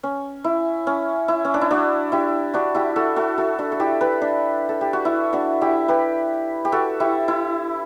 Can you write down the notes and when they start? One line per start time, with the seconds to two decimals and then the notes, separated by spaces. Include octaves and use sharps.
0.03 C#4
0.44 E4
0.87 C#4
1.28 E4
1.45 C#4
1.54 D4
1.61 E4
1.71 D4 F#4
2.12 E4 G4
2.54 D4 F#4
2.75 E4 G4
2.96 F#4 A4
3.16 F#4 A4
3.38 F#4 A4
3.59 D4 F#4
3.72 A4
3.80 E4 G4
4.01 G4 B4
4.22 D4
4.69 A4
4.81 G4
4.93 F#4
5.05 E4
5.33 D4 F#4
5.61 E4 G4
5.88 G4 B4
6.65 G4
6.72 F#4 A4
7.00 E4 G4
7.28 E4